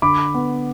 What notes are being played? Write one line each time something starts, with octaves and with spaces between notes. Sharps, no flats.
D3 B5 D6
B3